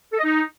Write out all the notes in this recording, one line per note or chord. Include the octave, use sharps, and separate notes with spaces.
A4
D#5
D#4